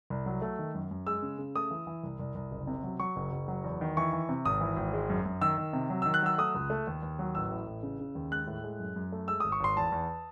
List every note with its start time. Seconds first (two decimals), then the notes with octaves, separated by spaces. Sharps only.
0.10 C2
0.26 F#3
0.42 A3
0.59 D#3
0.74 F#2
0.91 F#2
1.07 G#3 E6
1.22 C#3
1.39 C#3
1.55 A3 D#6
1.71 E3
1.87 E3
2.04 C2
2.19 C2
2.35 C2
2.51 F#1
2.67 C3
2.83 F#3
3.00 F#3 C#6
3.16 F#1
3.32 F#1
3.48 F#3
3.64 E2
3.81 D#3
3.97 E3 C#6
4.13 E3
4.29 C3
4.45 G#1 D#6
4.61 E3
4.77 G#1
4.93 G#3
5.09 F#2
5.25 F#2
5.41 D#3 E6
5.58 D#3
5.73 C3
5.90 F#3
6.02 D#3 E6
6.14 F#6
6.23 F#3 E6
6.38 A3 D#6
6.55 C#2
6.70 A3
6.87 D#2
7.02 D#2
7.19 F#3
7.35 A1 E6
7.51 A2
7.67 A1
7.83 C#3
8.00 C#3
8.15 D#2
8.31 G#3 F#6
8.47 A2
8.64 G#3
8.80 F#2
8.96 F#2
9.12 A3
9.28 G#3 E6
9.40 G#1 D#6
9.52 C#6
9.60 G#1 C6
9.77 E2 A5
9.92 E2